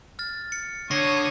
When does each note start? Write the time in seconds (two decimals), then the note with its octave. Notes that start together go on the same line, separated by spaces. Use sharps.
0.19 F6 A6
0.52 C#7
0.91 D3 C#5 C#6 D#6 A#6 C7